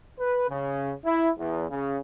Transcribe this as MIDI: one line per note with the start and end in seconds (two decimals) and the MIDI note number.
0.19 0.49 71
0.49 0.91 49
1.05 1.30 64
1.38 1.66 40
1.70 1.98 49